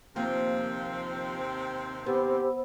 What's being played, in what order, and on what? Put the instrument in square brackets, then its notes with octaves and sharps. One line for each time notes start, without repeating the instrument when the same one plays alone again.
[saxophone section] D#2 C3 C4 [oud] F3 A#3
[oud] B3 [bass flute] G4 [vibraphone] C5 B5 E6